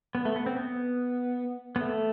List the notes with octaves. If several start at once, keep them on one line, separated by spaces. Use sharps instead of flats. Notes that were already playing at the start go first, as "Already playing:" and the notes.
B3
A3
B3
C4
B3
B3
A3